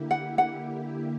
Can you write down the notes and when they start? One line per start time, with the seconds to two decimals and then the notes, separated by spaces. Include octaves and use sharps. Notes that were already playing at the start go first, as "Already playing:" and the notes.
Already playing: D3 A#3 E4 G4
0.11 F#5
0.38 F#5